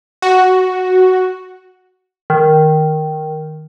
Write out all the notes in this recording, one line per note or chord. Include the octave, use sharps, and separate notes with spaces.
F#4
D#3